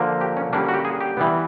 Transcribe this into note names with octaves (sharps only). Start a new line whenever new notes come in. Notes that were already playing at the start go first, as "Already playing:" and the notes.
Already playing: D3 F3 A#3
G4
C#4
D3 G3 A#3 C#4 D4
F#4
G4
G#4
G4
E3 G3 B3